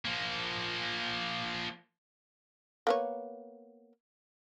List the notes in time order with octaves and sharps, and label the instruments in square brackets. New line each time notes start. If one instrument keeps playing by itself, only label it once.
[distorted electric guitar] F3 A#3
[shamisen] A#3 B3 C#5